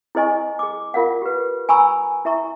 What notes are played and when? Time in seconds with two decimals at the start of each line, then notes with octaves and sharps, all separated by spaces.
0.15 E4 G#4 C5 D#5 G#5 C#6
0.59 G#4 D6
0.94 F4 A#4 F5 F#5
1.22 G4 B4
1.69 G#5 A#5 B5 C#6 E6
2.25 E4 E5 A#5 C#6